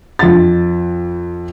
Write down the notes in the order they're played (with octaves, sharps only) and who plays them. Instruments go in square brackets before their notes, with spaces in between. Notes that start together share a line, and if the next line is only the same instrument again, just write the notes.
[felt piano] F2 A6